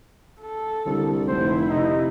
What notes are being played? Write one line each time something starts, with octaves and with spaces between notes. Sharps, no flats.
A4
C2 D3
F1 E4 C5
C3 D#4